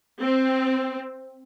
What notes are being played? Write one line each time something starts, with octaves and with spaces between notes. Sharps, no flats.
C4